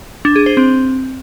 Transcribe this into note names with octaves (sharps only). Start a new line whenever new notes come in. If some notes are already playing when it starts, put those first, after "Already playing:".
D4
G#4
C5
C4